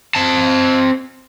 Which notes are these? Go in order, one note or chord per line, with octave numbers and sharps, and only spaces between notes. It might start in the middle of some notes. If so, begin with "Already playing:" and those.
C4 A5